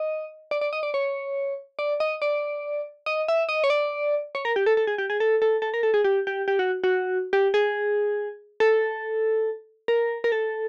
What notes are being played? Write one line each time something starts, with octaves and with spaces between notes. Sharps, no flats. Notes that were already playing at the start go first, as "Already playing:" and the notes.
Already playing: D#5
D5
D5
D#5
D5
C#5
D5
D#5
D5
D#5
E5
D#5
C#5
D5
C#5
A#4
G4
A4
A4
G#4
G4
G#4
A4
A4
A4
A#4
A4
G#4
G4
G4
G4
F#4
F#4
G4
G#4
A4
A#4
A#4
A4